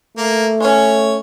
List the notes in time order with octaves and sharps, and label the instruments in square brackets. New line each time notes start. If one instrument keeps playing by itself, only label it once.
[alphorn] A3 [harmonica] A#3
[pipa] G#3 C#4 [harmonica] C#5